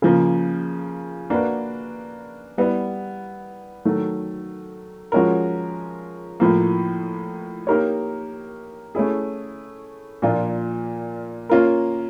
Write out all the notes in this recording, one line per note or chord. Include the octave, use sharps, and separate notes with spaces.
C#3 F3 A#3
A#3 D4 F#4 B4
G3 B3 E4
D#3 F#3 A3
F3 G#3 C#4 F#4 A#4
A2 F3 A#3
A#3 D#4 G4 A#4 C#5
A3 C#4 E4 G#4
A#2 F3 A#3 D4 F4
A#3 C#4 F4 A#4